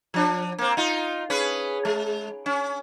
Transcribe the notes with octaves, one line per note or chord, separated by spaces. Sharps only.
F3 D4
A#3 C4
D#4 F4
C#4 G#4 B4
G#3
C#4